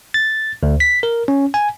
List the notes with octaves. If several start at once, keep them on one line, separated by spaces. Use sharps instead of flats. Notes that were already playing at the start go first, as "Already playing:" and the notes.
A6
D2
B6
A#4
C#4
G#5